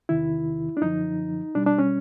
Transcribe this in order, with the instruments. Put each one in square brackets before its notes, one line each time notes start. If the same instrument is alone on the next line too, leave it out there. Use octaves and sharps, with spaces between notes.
[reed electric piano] E2 C3 D#3 E4
D4
F#2 D3 F3 D#4
B2 G3 D4
D4
C#4